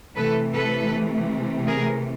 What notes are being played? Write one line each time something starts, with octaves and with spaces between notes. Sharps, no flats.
C3 E3 A3 A4 B4
A4 B4
G#4 A#4